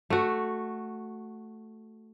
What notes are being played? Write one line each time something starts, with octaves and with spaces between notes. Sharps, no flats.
A3 F#4